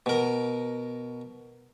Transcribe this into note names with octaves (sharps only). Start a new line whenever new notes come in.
B2 A#4